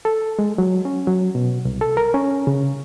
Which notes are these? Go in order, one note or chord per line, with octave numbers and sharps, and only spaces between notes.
A4
G#3
F#3
C#4
F#3
B2
C2
A4
A#4
C#4
C#3